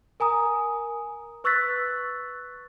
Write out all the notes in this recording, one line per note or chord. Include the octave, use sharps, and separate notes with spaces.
A#4 G#5 A#5 D#6
B4 C#6 E6 F#6 A6 B6